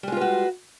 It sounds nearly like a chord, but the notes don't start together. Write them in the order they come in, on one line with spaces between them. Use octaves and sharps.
G3 G#3 F4 B4 F#4